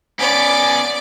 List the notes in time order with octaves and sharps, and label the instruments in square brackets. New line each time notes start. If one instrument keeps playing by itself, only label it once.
[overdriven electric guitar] B3 C#4 [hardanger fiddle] D5 D6